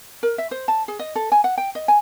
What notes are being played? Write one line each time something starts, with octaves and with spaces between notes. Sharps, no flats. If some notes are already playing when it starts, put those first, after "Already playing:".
A#4
E5
C5
A5
G#4
D#5
A4
G#5
F#5
G5
D#5
G#5